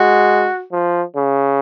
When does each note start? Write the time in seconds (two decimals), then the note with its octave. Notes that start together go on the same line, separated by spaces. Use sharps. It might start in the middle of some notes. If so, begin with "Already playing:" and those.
Already playing: G#3 F#4
0.72 F3
1.16 C#3